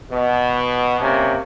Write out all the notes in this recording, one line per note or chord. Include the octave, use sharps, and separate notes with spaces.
B2
C3 A#3 C#4